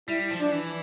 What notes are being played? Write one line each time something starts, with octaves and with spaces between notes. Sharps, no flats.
G3 E4
F3
D4
E3